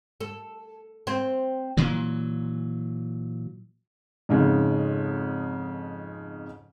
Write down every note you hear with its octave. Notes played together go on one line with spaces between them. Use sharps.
A4
C4
A#2 E3 F#3
F2 G#2 C#3